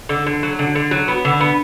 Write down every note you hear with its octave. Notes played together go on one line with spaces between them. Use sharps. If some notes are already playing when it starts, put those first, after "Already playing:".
D3
D3
F#3
D3
D3
F#3
B3
D3
B3